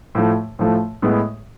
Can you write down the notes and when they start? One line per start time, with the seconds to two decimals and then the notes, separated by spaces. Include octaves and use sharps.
0.15 A2 F3 A3
0.59 A2 F3 A3
1.02 A2 G#3 B3